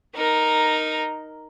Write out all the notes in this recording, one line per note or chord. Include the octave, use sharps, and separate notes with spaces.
D#4 A#4